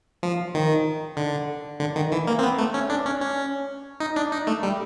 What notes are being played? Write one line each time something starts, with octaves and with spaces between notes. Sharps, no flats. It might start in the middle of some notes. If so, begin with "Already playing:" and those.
F3
D#3
D3
D3
D#3
E3
A#3
C4
B3
A3
C#4
D4
C#4
C#4
D#4
D4
D#4
A3
G3